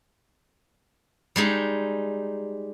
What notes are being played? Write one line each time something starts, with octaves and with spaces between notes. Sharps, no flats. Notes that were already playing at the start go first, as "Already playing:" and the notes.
G3 G#3 D#4